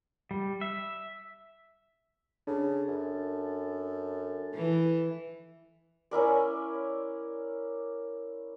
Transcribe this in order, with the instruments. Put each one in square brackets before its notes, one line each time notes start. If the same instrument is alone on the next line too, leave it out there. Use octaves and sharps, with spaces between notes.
[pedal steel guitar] G3
E5
[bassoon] C#3 [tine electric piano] D4 [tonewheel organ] A4
[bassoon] F#2
[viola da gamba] E3
[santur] C#4 E4 A#4 D5